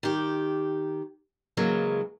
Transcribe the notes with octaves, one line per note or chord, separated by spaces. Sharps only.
D#3 G4
C#3 E3 F#3 G#3 A#3